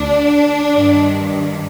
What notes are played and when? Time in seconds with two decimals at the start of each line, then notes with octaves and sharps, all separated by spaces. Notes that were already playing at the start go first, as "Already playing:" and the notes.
Already playing: D2 D3 D4
0.75 G2 D#3